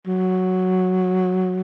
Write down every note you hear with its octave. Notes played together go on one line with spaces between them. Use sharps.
F#3